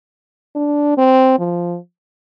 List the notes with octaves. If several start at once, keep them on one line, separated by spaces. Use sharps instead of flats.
D4
C4
F3